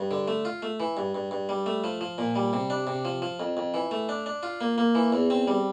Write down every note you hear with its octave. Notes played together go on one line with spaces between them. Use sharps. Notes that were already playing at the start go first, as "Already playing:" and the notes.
Already playing: G2
D3
A3
F4
A3
E3
G2
G2
G2
G3
A3
F3
F3
A#2
G3
C3
D4
C3
F3
F3
F2
F2
E3
A3
D4
D4
F4
A#3
A#3
E3
E2
C4
G3